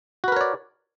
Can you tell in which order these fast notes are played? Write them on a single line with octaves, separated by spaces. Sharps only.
F#4 B4 A#4 C#5 D5